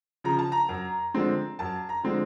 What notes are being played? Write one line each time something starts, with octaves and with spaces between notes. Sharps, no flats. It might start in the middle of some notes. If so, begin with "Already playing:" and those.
C#3 F3 A#5
A5
A#5
F#2
D3 F3 G#3 C4
F#2 A5
A#5
D3 F3 G#3 C4